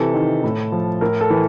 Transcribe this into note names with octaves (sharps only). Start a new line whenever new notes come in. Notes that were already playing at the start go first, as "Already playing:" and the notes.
Already playing: C3 E3 A4
D#3
A2
F3
A2 A#4
A4
E3